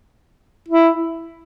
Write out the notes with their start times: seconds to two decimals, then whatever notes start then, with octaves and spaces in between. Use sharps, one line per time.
0.68 E4